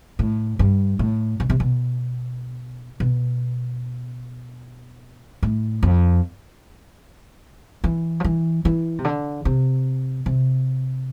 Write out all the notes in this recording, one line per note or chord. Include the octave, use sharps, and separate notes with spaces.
A2
G2
A2
B2
C3
B2
B2
A2
F2
E3
F3
E3
E3
C3
D3
C3
C3